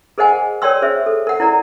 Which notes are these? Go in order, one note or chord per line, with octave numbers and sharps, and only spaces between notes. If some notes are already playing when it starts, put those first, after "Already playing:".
G#4 A#4 C5 D#5 F#5 G#5
A#4 C#5 D5 G5 C6 E6
G#4 C5 E5
A4
A#4 F#5
E4 A#4 D5 A#5